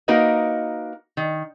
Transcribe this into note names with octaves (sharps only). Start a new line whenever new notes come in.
A#3 D#4 F#4 A#4 B4 D#5
D#3